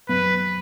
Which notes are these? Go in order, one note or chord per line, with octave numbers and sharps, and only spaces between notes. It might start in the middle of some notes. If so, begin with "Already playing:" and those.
F#2 F#3 B3 B4